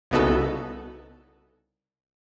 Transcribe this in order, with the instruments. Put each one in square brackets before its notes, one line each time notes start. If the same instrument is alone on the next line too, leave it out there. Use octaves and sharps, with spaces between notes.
[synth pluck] C2 C#3 B3 D#4 F#4 A4